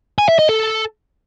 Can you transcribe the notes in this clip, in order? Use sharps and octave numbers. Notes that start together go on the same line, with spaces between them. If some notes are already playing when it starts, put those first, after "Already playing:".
G#5
E5
D#5
A4